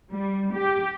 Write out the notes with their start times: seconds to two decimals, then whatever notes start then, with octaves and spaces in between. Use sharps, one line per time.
0.11 G3
0.53 G4